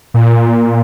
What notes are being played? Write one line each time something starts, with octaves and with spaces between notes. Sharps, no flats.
A#2